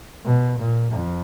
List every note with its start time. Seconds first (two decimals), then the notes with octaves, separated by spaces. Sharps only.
0.25 B2
0.59 A#2
0.92 F2